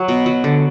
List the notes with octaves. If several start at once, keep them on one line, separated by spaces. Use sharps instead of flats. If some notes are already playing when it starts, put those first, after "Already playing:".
Already playing: F#3
B2
F#3
D3